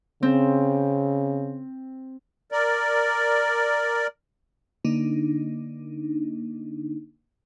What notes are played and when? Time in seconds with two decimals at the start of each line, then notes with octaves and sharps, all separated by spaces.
0.23 C#3 C4
2.52 A#4 D5
4.84 D3 A#3 D4 D#4